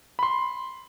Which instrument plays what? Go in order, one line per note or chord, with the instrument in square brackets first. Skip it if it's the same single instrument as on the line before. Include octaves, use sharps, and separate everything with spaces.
[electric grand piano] B5 C6